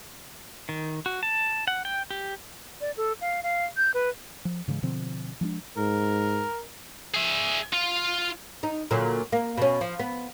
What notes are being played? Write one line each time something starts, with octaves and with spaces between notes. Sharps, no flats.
D#3
F#4
A5
F#5
G5
G4
D5
A4
F5
F5
G6
B4
F3
G#2 C#3 E3 G#3
B2 D3 F3 C4
F3 G#3 B3 D4
G#2 A#4
G#4 E5
F4
D#4
A#2 D3 F#3
A#3
B2 C#4
F3
B3